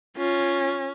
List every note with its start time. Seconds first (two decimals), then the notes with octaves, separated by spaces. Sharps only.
0.17 C#4 F4